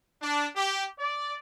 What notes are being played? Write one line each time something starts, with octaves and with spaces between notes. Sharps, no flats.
D4
G4
D5